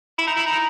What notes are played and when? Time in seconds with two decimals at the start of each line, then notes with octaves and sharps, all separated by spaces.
0.18 E4
0.27 D#4
0.37 E4
0.46 D#4